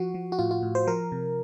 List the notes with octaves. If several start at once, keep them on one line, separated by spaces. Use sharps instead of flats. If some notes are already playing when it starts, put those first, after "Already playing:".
Already playing: F3 F#4
F3
F#4
A2 F4
F4
A2
C5
F3 A#4
C3